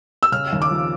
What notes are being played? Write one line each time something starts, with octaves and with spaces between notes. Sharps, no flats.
E6
C#3 F6
D#2
D6
F3